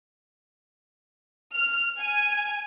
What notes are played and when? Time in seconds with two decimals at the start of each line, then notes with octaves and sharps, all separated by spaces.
1.56 F6
2.02 G#5